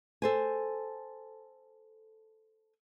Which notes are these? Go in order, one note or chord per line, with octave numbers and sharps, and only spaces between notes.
A4 C5 G#5